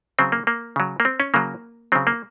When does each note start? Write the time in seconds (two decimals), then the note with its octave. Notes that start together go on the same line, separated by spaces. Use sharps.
0.19 C#3 F#3 C4
0.32 A#3
0.47 A#3
0.76 C#3 F#3
1.00 A#3
1.05 C4
1.20 C#4
1.34 C#3 F#3 A#3
1.92 C#3 F#3 C4
2.07 A#3